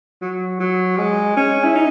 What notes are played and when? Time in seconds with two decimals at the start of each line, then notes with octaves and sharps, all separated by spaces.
0.22 F#3
0.60 F#3
0.98 G#3
1.37 C#4
1.64 E4
1.75 D#4